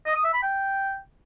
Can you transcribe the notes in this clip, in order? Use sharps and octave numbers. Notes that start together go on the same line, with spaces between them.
D#5
D#6
E5
B5
G5